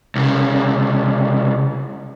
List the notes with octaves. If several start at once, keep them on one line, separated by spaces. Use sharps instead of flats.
C2 C#3